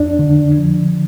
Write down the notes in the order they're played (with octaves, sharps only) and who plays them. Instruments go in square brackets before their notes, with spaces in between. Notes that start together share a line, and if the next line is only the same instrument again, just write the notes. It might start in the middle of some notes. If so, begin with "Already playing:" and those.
Already playing: [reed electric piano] F2 D4
D3
F3